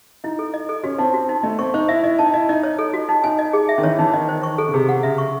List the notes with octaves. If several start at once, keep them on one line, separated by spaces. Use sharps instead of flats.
D#4 E4
A4
D#5
A4
C#4 F#4
C4 D#4
F#4
D#4
A3 D#5
C4 C#6
D#4 C5
E4 E5
E4 D#5
D#4 A5
E4 D#5
D#4 D#5
C#5
A4
F#4
D#4
D#4 G#5
D#5
G#4
E5
D#3
E3 C#5
E3 D#4
D#3 D#5
C5
C#6
A4
C#3
C3 G#4
F#5
C#3 E5
C#6